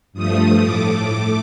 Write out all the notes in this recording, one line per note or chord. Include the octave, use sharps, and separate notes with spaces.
G2 F3 A3 D#6
A2 A3 D6
A3